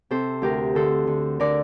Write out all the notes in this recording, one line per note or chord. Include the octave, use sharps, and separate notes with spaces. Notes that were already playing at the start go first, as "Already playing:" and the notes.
C3 A4 C5
D2 G4 A#4
D3 A4 C5
D3
D3 A#4 D5